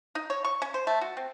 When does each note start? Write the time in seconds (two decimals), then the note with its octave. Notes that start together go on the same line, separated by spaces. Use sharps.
0.15 D#4
0.30 C#5
0.45 C#6
0.62 C#4
0.74 C5
0.87 A3
1.01 F#4
1.17 C4